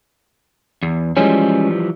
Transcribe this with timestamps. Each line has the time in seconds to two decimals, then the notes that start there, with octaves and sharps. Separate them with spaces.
0.83 E2
1.16 E3 F3 G3 G#3 C#4